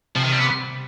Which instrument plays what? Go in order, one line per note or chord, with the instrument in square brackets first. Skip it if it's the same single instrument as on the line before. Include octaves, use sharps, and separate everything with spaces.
[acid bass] C3 [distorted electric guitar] F3
[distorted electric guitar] D#3
G3
B3